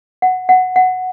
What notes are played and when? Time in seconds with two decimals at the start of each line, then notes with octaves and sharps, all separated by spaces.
0.22 F#5
0.49 F#5
0.76 F#5